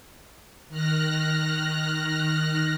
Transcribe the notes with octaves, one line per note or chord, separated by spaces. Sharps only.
D#3 F6 F#6 A#6